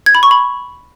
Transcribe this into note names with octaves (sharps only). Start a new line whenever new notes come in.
G#6
B5
C#6
B5